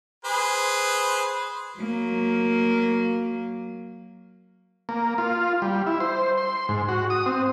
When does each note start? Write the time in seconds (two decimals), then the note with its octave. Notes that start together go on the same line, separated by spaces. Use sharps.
0.25 G#4 B4 C5
1.77 F#3 A#3
4.89 A#3
5.18 F4
5.62 G3
5.87 E4
6.00 C5
6.38 C6
6.69 G#2
6.88 F#4
7.10 D#6
7.26 C4